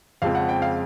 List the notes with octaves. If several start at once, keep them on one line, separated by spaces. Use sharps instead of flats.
F2 C#3 F3 G#3 C4 F5
F#5
G5
F5